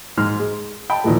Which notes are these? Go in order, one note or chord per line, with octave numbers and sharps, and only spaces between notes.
G#2 C6 F6
G#3
G5 A5 B5
A#1 D#2 A#2 E3 F3 A3